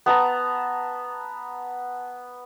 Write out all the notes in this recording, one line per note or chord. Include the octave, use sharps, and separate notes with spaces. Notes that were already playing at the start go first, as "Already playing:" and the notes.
B3 A5 A#5